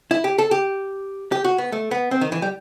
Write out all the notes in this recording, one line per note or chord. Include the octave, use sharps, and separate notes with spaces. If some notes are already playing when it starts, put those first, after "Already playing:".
E4
G4
A4
G4
G4
F#4
B3
A3
B3
C4
D#3
E3
G3